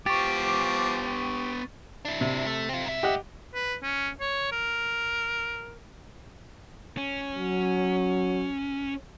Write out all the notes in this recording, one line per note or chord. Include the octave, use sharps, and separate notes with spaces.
F3 B3 G4 G5 C#6 D6 A6
D4 E4
C3
A3
C4 F4
G#2 E5
G4 D#5 F#5
B4
C#4
C#5
A#4
C#4
F#3